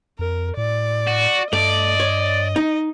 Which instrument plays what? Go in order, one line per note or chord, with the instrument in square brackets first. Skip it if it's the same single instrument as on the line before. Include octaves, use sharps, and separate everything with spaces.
[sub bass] F2 [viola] A#4
[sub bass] A2 [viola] D5
[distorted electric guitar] F#4
[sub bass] G2 [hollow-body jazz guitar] A3 [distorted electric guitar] D5 [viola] D#5
[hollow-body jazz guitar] C#5
D#4